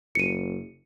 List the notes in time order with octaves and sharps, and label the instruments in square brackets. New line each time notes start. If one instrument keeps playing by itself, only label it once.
[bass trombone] F#1 [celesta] C#7 D#7